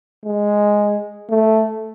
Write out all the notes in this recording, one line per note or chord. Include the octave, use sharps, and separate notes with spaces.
G#3
A3